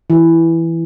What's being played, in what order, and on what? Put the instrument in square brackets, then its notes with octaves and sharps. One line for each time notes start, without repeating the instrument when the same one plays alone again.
[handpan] E3